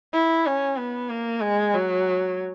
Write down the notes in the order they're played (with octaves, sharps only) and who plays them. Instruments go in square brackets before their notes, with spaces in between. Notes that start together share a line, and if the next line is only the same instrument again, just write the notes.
[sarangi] E4
C#4
B3
A#3
G#3
F#3